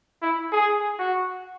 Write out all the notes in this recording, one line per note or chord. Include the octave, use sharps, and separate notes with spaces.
E4
G#4
F#4